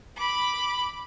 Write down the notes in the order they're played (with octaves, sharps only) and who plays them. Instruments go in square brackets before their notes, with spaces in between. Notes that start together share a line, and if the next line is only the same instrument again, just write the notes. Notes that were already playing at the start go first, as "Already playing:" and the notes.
[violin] B5 D6